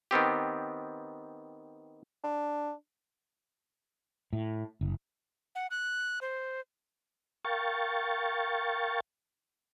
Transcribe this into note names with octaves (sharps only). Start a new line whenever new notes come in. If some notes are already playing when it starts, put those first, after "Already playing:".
D#3 B3 C4 G4
D4
A2
F#1
F#5
F#6
C5
A#4 F5 G5 C#6 A6